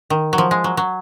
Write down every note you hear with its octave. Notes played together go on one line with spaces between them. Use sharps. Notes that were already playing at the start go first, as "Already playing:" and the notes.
D#3
F#3
F3
G#3
F#3
F#3